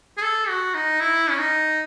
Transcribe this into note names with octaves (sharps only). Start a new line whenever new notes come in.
G#4
A4
F#4
D#4
E4
C#4
D#4